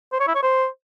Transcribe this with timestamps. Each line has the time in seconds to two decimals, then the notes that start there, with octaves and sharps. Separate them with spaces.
0.12 C5
0.20 C#5
0.28 E4
0.35 C#5
0.43 C5